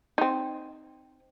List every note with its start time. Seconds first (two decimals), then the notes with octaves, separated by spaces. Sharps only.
0.18 C4 D#4